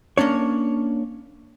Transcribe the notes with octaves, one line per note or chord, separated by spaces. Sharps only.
A#3 C#4 D4 C#5